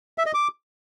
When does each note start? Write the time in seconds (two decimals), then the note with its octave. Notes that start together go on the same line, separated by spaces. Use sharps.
0.18 E5
0.26 D#5
0.34 D6